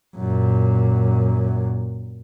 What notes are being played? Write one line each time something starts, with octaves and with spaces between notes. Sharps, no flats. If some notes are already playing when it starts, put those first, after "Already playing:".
F#2 A#2